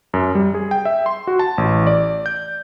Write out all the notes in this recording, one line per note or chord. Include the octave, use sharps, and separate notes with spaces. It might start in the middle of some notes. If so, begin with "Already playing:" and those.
F#2
G3
G#4
G5
E5
C6
F#4
A5
A1
D5
G6